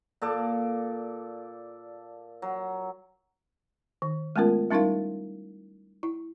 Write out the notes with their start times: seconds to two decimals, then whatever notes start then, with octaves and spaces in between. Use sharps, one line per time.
0.22 A#2 A4 D5
2.42 F#3
4.02 D#3
4.36 G#3 A3 B3 C#4 F4 A#4
4.71 G3 C#4 D#4 E4 A#4 F5
6.03 E4